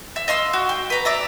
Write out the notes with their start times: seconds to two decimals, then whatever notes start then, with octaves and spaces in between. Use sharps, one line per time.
0.16 E5
0.28 D#5 F5 C6 E6
0.53 F#4
0.69 G5
0.90 B4 A#5
1.05 D5 E5 A#5